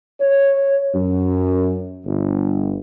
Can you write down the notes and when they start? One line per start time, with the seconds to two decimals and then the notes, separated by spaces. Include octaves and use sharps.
0.21 C#5
0.95 F#2
2.05 G1